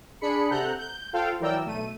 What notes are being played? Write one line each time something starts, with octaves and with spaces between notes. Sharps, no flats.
D4 G#4 B5 C#7
C3 A4 F#5 A#5 F#6 G6
G6
F4 A4 C5 F5 G5
E3 F#3 A#4 D5 G5 E6
B1 A3 D#7